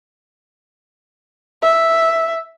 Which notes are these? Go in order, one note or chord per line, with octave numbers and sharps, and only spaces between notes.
E5